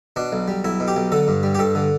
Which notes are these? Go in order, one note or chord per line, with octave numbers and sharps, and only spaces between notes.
B2 D4
B1
G3
B1 E4
B2
G4
B1
D3 A4
G2
G3
G4
G2 A4
D3